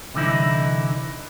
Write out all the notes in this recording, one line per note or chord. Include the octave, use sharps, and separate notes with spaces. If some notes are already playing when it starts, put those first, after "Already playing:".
C2 D3 E3 D#4 E4